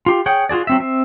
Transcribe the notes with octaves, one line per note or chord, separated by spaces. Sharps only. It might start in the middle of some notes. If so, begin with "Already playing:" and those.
F4 G4
G#4 C#5 F#5 G5
F4 F#4 G#4 D5
F#3 C4 E5
C4 E5